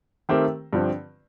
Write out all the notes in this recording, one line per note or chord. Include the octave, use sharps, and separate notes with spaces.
D#3 A3 C4 G4 A#4
G2 D3 F3 C4